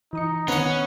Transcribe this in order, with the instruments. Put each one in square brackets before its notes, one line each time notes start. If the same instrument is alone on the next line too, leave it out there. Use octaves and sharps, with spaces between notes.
[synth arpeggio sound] E3 D#6 C#7 [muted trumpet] D#4
[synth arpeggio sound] D3 D#3 [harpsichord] B3 F#5 [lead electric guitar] C#4